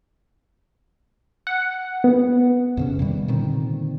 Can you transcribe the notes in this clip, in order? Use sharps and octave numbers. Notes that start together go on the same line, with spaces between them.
F#5
B3
F2 C#3 C#4
C3 D#3 G3
A#2 D3 D#3 C4